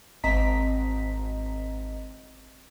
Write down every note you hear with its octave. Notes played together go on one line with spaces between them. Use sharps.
G#1 C4 D#5 A#5 B6